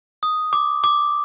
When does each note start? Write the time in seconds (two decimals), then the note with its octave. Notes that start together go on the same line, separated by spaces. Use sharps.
0.23 D#6
0.53 D6
0.84 D6